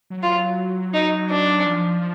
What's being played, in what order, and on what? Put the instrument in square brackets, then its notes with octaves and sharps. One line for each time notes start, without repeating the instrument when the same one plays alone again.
[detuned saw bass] F#3
[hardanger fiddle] F4
D#4
D4
[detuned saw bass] F3